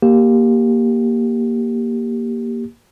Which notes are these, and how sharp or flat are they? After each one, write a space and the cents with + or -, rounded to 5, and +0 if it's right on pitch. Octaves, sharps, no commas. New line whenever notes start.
A#3 +5 G4 +0